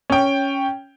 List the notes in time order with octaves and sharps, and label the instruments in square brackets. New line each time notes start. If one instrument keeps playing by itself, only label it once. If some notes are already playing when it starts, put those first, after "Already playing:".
[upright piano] C#4 G5